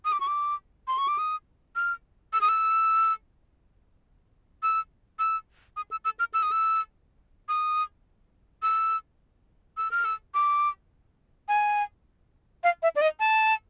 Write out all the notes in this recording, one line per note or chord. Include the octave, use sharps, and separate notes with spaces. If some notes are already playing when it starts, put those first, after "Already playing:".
D#6
D6
C#6
D6
C6
C#6
D6
D#6
F6
E6
D#6
E6
E6
E6
D#6
E6
E6
F6
E6
D#6
E6
D#6
E6
E6
F6
E6
D6
G#5
F5
E5
D5
D#5
A5